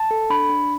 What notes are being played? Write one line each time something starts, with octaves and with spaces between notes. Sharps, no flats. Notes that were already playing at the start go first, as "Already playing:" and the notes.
Already playing: A5
A4
D4 B5
D4